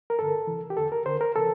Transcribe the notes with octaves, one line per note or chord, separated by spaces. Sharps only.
A#4
G2 D3 A4
D2 C3 E3
G4
E2 D3 A4
A#4
D2 D3 C5
A#4
C3 E3 A4